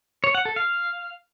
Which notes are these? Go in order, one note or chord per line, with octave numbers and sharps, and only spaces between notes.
C#5
F#5
A4
F5